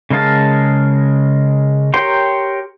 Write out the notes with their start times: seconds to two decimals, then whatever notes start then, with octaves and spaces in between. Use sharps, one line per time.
0.10 C#3 G#3 A#4 F5 A5
1.94 G4 A#4 C#5 G5 C6